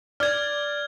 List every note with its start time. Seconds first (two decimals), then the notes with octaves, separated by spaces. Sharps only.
0.20 D5 F6 G#6